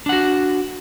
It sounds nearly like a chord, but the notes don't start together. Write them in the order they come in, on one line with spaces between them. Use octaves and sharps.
D4 F#5 F#4